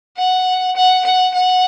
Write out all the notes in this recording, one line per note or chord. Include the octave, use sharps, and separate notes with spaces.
F#5
F#5
F#5
F#5